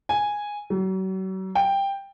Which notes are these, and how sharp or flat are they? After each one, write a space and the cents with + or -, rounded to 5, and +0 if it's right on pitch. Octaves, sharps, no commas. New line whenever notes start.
G#5 -5
F#3 +40
G5 +10